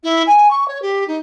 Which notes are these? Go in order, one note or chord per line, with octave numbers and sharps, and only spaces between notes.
E4
G#5
C#6
C#5
G4
D#4